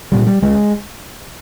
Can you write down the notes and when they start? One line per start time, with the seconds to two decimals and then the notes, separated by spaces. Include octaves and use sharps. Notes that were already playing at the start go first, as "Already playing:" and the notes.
0.12 C2 A#2 G3
0.27 G3
0.42 C#2 C#3 G#3